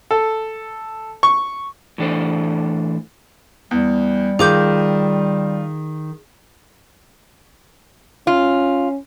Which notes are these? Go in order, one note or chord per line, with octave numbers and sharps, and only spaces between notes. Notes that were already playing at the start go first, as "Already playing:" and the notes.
A4
C#6
A2 E3 D4 A4 C5
E2 G3
D#3 F4 G#4 D6 G6
C#4 F4